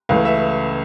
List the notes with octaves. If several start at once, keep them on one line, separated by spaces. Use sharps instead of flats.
C#2 C#3 E3 A3 F5
E5